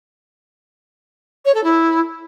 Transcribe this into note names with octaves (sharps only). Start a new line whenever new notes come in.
C#5
A4
E4